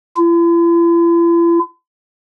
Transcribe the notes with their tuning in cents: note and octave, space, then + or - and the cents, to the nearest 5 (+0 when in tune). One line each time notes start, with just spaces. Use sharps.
E4 +45